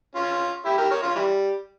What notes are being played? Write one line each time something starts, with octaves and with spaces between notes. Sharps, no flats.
C#4 F4
E4 G4
G4 A#4
A#4 C#5
C#4 F4
E3 G3